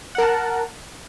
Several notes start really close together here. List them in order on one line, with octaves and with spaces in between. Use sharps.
F#5 A#4 A5